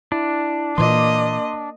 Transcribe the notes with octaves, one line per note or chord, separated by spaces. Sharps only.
D4 E4
A#2 E3 A#3 D#5 C6 D6